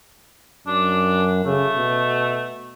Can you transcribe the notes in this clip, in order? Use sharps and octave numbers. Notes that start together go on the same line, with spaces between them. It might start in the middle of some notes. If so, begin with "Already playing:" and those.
F#2 D4
C#3 A3
B2